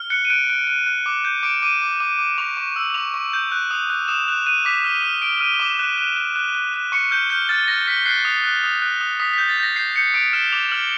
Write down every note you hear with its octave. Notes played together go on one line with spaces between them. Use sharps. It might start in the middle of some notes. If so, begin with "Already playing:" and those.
Already playing: F6
F#6 C#7
D#7
F#6 D7
F#6 D7
F#6
F#6
D6
G6
D6 D7
D6 D#7
D6
D6
D6
C#6 F7
C#6
E6
C#6 F7
C#6
G6
F#6
D#6
F#6
D#6 E7
F#6 F7
F#6 D#7
D6 B6
F6
F6
F6 D7
F6 D#7
D6 E7
F#6
F#6
F#6
F#6
F#6
F#6
C#6 C#7
F6 G6
F6 G6
F6 A6
F6 A#6
F6 B6
F#6 C7
D#6
F#6
D#6
F#6
D#6
D#6 B6
G6 B6
A6
G6
A#6
G6 C7
G6 C#7
D#6 D7
F6 E7
D6 F7
F6 F#7